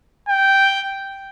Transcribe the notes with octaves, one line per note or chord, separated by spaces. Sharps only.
G5